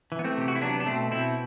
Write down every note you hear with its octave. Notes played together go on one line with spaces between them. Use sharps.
E3
B3
A3 C4
C3 G4
F#4
E4
F#3 B3 D4
D4
B2 A3 C4
B2 C4 E4